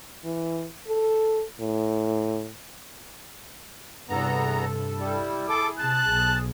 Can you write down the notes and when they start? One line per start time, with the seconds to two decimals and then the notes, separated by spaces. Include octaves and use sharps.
0.24 E3
0.88 A4
1.60 A2
4.09 E2 G2 C3 B3 A4 A#5
4.99 G3 E4
5.48 G#4 A4 D6
5.79 C3 A5 F#6
6.09 B1